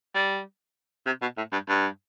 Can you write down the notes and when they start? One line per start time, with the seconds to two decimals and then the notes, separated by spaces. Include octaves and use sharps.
0.14 G3
1.06 C3
1.21 B2
1.37 A2
1.52 G2
1.68 G2